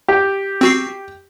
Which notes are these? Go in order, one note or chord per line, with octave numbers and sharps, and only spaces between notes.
G4
C4 F#4 C7